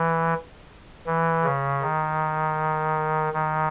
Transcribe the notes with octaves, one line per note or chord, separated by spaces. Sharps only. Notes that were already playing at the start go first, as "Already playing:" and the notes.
Already playing: E3
E3
C#3
D#3
D#3